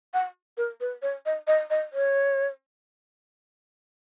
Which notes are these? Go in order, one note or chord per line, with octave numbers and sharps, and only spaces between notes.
F#5
A#4
B4
C#5
D#5
D#5
D#5
C#5